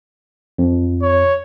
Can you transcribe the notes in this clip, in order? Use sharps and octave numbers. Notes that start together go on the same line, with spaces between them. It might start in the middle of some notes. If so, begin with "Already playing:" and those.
F2
C#5